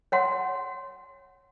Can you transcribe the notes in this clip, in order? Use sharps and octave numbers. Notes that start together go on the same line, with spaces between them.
C#5 F#5 C6